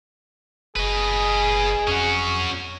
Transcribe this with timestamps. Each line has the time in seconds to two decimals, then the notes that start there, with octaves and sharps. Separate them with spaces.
0.76 F#1 G#4 B4 D#5
1.88 F2 C#4 F#4